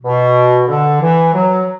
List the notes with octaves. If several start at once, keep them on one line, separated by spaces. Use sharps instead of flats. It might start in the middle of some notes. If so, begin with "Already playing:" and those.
B2
D3
E3
F#3